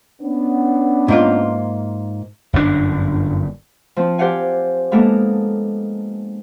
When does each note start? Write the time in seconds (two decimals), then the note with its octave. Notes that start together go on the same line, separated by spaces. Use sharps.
0.22 B3 C#4 D4
1.08 G#2 A#3 F4
2.53 G1 F#2 B2 D4
3.96 F3 C4
4.18 G4 C5 D5 F5 F#5 G#5
4.91 G#3 A#3 B3 D4 A4 A#4